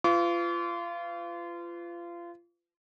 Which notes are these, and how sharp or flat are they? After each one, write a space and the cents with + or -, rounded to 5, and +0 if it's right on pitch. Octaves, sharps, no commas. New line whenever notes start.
F4 -25 B4 +40 D6 -45